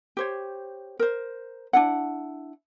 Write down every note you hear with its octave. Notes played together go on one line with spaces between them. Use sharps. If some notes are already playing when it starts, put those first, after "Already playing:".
G4 C5 C#5
A#4 C5
D4 E4 F#5